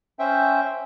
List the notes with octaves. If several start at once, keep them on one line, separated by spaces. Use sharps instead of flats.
C#4 C5 E5 G5